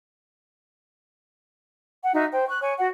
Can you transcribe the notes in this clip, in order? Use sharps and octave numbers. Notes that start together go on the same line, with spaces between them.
F#5
D#4 F#4 E5
C5 G5
C#6 F#6
C#5 G#5 C#6
F#4 F#5